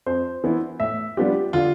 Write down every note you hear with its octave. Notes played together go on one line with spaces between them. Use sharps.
F2 C5
E3 B3 E4
A2 E5
G3 B3 D4 F4 G4
D3 F4